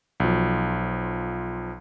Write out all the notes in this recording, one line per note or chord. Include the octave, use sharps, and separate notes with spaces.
B1 F3